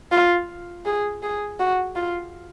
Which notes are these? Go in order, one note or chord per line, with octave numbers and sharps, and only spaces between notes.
F4
G#4
G#4
F#4
F4